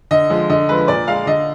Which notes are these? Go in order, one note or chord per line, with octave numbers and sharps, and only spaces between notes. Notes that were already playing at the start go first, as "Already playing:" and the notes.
D3 D#5
F3 G#3
D3 D#5
F3 G#3 B4
A#2 D5
G#3 F5
D3 D#5